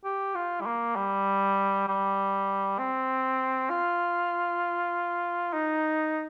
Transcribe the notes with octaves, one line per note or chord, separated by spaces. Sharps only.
G4
F4
G3
A#3
G3
G3
C4
F4
D#4